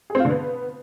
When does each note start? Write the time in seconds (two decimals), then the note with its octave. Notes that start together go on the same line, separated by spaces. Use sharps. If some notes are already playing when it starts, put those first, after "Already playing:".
0.10 G#4
0.15 C4
0.20 F4
0.25 D3
0.30 B3